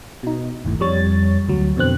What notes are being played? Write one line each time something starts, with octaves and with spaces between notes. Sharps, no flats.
B2 D#4
G1 D#2 A2
F2 G3 C#5 A6
D2 F#3
F2 B2 D3 C4 F#6